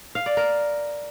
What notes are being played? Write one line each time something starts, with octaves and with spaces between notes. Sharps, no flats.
F5
D5
A#4